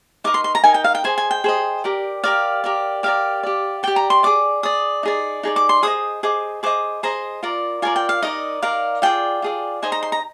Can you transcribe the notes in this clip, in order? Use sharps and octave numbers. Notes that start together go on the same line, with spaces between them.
D#4 A#4 D#5 D6
C6
C6
A#5
D#4 A#4 D#5 G#5
G5
F5
G5
G#4 C5 D#5 G#5
G#5
G5
G#4 C5 D#5
G4 A#4 D5
G4 A#4 D5 F5
G4 A#4 D5
G4 A#4 D5 F5
G4 D5
G4 D5 G5
A#5
C6
G#4 D5 D6
G#4 D5 D#6
D#4 G#4 D5
D#4 G#4 D5
D6
C6
G#4 C5 D#5 D#6
G#4 C5 D#5 D6
G#4 C5 D#5 D6
G#4 C5 D#5 A#5
F4 A#4 D5
F4 A#4 D5 G#5
G5
F5
D#4 A#4 D5 D#5
D#4 A#4 D5 F5
F4 G#4 D5 G5
F4 G#4 D5
D#4 G#4 C5 D#5 G#5
A#5
C6
A#5